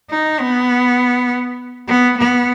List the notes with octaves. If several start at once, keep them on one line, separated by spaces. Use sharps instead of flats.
D#4
B3
B3
B3